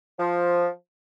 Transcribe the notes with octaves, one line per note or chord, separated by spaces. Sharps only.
F3